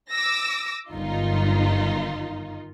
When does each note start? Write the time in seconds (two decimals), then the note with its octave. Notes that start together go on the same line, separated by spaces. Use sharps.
0.10 D6 E6 A#6
0.90 G1 F#2 D#3 D#4 F4